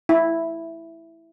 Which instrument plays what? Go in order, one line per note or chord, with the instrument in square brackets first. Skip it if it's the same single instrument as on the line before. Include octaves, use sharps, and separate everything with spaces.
[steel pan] E4